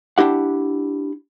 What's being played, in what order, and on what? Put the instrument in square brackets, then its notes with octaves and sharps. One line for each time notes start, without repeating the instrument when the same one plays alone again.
[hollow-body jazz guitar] D4 E4 G4 F#5